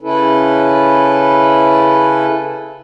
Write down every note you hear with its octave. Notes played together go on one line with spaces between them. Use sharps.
C#3 C#4 E4 A4 B4